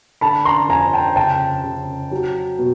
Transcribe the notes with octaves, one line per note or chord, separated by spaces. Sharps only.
D3 A5 B5
A#5 C6
F2 G#5 A#5
G5 A5
C#3 G5 A5
C#3
F#3
B2